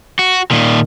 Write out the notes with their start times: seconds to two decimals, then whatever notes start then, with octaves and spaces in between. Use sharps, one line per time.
0.19 F#4
0.51 A#2 D#3